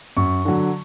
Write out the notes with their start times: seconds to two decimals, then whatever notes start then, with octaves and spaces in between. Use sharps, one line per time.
0.17 F#2 C#6
0.45 D3 F#3